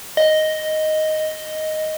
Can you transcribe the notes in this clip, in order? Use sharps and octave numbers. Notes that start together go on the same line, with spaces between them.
D#5